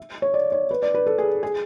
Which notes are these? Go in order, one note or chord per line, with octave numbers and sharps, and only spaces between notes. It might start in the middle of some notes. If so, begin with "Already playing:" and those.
Already playing: E5
C#5
D5
C#5
B4
D5
B4
A4
G#4
G#4